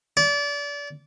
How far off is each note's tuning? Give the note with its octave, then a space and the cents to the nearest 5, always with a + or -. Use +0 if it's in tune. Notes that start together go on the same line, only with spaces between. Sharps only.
D5 -30